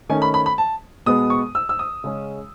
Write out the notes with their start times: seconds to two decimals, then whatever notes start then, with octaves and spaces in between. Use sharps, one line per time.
0.09 D#3 A3 C#4 G#5
0.22 B5
0.34 B5
0.46 B5
0.58 A5
1.06 B2 G#3 B3 D#6
1.30 C#6
1.55 E6
1.69 E6
1.79 D#6
2.04 C#3 G#3 C#4